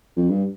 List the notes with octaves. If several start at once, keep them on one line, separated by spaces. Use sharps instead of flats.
F2
G2